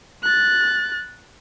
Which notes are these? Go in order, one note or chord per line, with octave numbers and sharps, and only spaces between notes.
F#6 A6